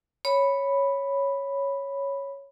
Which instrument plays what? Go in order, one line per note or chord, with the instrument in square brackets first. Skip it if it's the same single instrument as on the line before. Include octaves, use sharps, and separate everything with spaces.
[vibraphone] C#5 B5